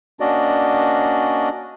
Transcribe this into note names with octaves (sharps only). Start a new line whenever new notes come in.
A#3 C#4 D4 F#4 D5 D#5